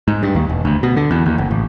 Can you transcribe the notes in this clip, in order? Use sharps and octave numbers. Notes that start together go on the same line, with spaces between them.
G#2
G2
D#2
E1
D2
B2
D3
E2
D#2
F#1
A1